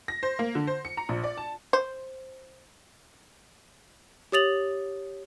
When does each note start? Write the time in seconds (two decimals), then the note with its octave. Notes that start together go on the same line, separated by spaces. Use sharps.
0.08 A#6
0.23 C5
0.39 A#3
0.55 D3
0.67 C5
0.85 C#7
0.97 A#5
1.09 A#1
1.24 D5
1.37 A5
1.73 C5
4.32 G4 C#5 D#6 A6 F7 F#7